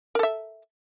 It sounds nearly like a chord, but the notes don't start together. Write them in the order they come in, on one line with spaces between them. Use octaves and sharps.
A#4 A4 E5